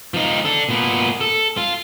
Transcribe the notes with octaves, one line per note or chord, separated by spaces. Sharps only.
F3 D#4
D4 A4
A#2 B3
A4
F4